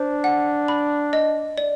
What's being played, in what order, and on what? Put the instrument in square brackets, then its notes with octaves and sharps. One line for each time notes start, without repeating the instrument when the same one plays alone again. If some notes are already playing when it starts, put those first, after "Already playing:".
Already playing: [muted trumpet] D4 [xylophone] C5
[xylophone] F#5
B5
D#5
D5